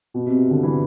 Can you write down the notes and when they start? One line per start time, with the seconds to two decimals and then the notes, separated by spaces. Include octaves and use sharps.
0.14 B2
0.27 C3
0.51 D3
0.63 E3